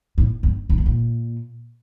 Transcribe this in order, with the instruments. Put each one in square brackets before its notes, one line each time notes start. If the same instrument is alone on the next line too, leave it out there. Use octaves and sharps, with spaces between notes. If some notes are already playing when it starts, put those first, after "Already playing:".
[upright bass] A2
G2
A#2
C3
A#2